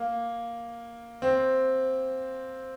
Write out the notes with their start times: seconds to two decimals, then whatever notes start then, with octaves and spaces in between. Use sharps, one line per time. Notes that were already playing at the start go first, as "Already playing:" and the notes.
Already playing: A#3
1.22 C4